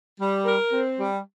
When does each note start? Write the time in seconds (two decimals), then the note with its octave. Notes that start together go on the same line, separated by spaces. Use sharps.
0.20 G3
0.45 A#4
0.72 C4
0.97 G3